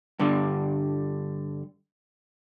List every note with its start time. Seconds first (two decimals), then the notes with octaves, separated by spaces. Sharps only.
0.19 G2 D3 G3